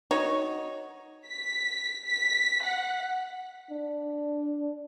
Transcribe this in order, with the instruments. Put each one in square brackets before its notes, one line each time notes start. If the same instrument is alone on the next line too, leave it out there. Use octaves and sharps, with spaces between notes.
[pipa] D#4 F#4 C#5
[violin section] B6
B6
F#5
[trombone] D4